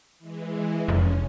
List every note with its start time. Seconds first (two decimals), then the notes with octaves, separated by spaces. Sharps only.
0.19 E3 G#3
0.88 F1 C#4